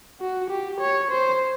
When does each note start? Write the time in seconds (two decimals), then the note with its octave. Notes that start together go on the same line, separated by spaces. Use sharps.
0.21 F#4
0.50 G4
0.80 C#5
1.11 C5